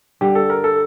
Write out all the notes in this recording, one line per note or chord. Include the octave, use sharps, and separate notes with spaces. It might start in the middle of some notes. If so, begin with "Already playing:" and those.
G2 D3 G3 G4
A4
A#4
A4